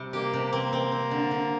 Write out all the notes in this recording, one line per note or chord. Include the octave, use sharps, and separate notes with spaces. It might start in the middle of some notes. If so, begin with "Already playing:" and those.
Already playing: C3 G3
A#3 G4
C3
A#3 C4
C4
C4
D3
D3